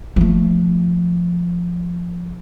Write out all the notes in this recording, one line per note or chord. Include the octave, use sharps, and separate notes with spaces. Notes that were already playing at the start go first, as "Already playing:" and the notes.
F3 A3